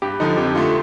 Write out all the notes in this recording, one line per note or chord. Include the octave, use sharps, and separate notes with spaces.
G2 G4
D3 F3 D#4
F2 G4
D3 A3 F4